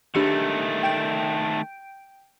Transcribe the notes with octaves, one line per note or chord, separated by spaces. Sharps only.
D#3 A3 D4 G4 C#7
G5 G6 D7